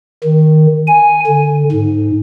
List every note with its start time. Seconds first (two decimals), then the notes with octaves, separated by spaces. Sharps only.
0.24 D#3
0.87 G#5
1.26 D3
1.72 G#2